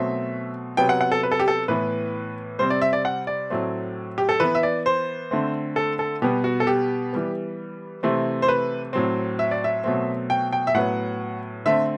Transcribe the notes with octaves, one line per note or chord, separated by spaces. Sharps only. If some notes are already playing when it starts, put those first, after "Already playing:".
Already playing: B2 F#3 A3 C4 E5
C3 F#3 B3 G5
F#5
F#5
A4
B4
A4
G4
A4
A2 E3 B3 B4
C3 G3 C4 C5
D5
E5
D5
F#5
D5
A2 F#3 A3 C4
G4
A4
E3 B3 B4
E5
D5
C5
D3 A3 C4
A4
A4
B2 G3 B3 G4
F#4
A4
G4
E3 G3 B3
C3 E3 A3 C4
C5
B4
A2 F#3 C4
E5
D5
E5
B2 F#3 A3 C4
G5
G5
E5
A2 F#3 B3 F#5
D3 A3 C4 E5